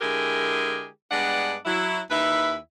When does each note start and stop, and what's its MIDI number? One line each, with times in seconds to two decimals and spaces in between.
0.01 0.87 50
0.01 0.87 56
0.01 0.87 64
0.01 0.87 67
0.01 0.87 68
0.01 0.87 70
1.11 1.56 43
1.11 1.56 56
1.11 1.56 59
1.11 1.56 62
1.11 1.56 74
1.11 1.56 78
1.66 1.99 54
1.66 1.99 64
2.10 2.55 39
2.10 2.55 63
2.10 2.55 64
2.10 2.55 71
2.10 2.55 76